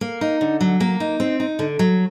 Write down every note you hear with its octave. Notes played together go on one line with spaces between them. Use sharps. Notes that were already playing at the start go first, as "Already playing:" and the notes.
A#3
D#4
D3
F#3
A#3
D#4
C4
D#4
D3
F#3